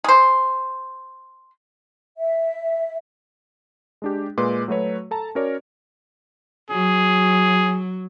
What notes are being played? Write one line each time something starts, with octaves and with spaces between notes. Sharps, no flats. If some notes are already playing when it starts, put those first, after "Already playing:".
G#4 C5
E5
G#3 D4 G4
A#2 G#3 B4 C6 D6
F#3 A3 F#4 B4 C#5
A4 A5 A#5
C#4 F#4 A#4 C#5 D5
F#3 G#4